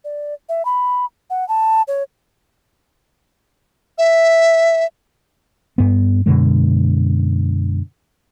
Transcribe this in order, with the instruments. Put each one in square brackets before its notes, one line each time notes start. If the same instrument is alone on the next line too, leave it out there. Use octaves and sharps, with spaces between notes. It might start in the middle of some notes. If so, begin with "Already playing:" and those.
[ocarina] D5
E5
B5
F#5
A5
C#5
[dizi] E5
[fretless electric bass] G2 B3
F#2 B2 D3 G#3